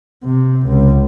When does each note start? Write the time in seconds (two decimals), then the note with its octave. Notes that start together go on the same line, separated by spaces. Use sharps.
0.24 C3
0.67 C#2